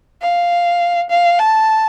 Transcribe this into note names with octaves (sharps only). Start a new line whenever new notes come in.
F5
F5
A5